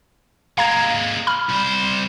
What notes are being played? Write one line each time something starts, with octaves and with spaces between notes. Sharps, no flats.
G#3 A#3 F5 A#5 G#6
B5 F6
C2 C5